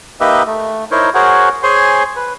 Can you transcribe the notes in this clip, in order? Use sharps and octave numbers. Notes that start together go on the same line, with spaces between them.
A#3 D#4 G4 B4 D#5 E5
A3
D#4 E4 A#4 C5 C#5
F#4 G#4 A#4 C5 C#5 F#5
G#4 C5 C#5 G#5 C6
B4